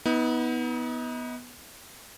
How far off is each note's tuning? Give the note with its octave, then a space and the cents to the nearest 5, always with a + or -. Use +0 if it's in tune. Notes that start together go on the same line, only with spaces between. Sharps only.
B3 -5 D#4 +40